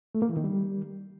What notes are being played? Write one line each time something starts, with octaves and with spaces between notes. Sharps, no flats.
A3
A#3
E3
D#3
G3